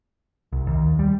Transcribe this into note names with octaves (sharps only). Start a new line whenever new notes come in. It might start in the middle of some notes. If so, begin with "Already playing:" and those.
C2
D#2
G3